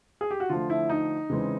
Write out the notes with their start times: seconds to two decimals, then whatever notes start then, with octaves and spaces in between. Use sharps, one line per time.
0.21 G#4
0.31 G4
0.40 F#4
0.49 D3 F3 A3 F4
0.70 E4
0.90 D#4
1.30 C#3 E3 G#3 C4